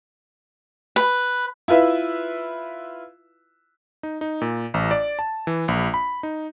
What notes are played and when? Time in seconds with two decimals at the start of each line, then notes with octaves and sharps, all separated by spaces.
0.96 B4
1.68 E4 F4 B4 E5
4.03 D#4
4.21 D#4
4.41 A#2
4.74 A1
4.91 D5
5.19 A5
5.47 E3
5.68 A#1
5.94 B5
6.23 D#4